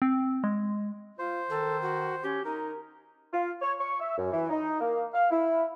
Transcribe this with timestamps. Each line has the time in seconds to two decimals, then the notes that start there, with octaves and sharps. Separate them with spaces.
0.02 C4
0.44 G#3
1.19 F4 C5
1.50 D#3 A4
1.82 F#4
2.23 C#4 G4
2.45 D#4 A#4
3.33 F4
3.61 C#5
3.79 C#6
4.00 E5
4.18 F#2
4.32 E3
4.49 D#4
4.80 A#3
5.14 F5
5.31 E4